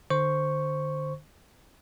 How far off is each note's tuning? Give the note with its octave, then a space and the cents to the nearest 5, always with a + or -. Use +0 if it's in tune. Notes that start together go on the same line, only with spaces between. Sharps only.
D3 +30 C5 +0 C#6 +0